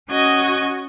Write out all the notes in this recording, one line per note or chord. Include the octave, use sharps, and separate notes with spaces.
C#4 F#4 D#5 D#6 G#6